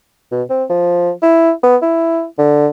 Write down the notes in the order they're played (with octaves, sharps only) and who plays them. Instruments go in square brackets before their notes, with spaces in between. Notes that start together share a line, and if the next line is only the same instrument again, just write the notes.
[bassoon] B2
C4
F3
E4
B3
E4
D3